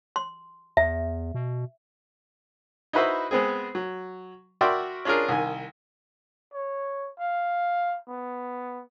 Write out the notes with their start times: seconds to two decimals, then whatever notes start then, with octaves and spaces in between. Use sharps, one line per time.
0.16 C6
0.77 E2 E5
1.34 B2
2.93 D#4 E4 F#4 B4 C5 E5
3.31 G#3 B3 C4 G#4
3.75 F#3
4.61 F#4 A#4 D5 E5 G5 C6
5.05 C#4 D4 F4 G#4 A#4
5.29 C2 D#3 G#5
6.54 C#5
7.18 F5
8.08 B3